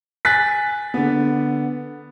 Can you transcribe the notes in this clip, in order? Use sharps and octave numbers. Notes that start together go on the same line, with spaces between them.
G#5 F#6 A6 B6
D3 B3